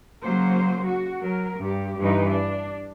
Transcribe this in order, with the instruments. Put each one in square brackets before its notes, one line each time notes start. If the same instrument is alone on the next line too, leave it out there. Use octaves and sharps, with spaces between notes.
[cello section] C#3 F#3 A#3 C5
F#4
F#3 A#4
G2 G4
G2 E3 D#4 B4
D4